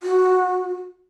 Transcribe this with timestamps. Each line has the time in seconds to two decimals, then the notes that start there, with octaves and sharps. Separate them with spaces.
0.03 F#4